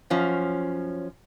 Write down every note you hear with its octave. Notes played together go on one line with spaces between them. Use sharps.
F#2 F3 C#4